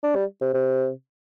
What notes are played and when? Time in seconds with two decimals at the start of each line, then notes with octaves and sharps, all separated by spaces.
0.03 D4
0.15 G3
0.41 C3
0.54 C3